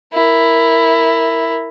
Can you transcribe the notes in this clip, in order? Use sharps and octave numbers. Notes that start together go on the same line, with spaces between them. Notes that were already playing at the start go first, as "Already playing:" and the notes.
E4 A#4